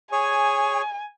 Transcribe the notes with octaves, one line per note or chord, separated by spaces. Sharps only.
G#4 C#5 G#5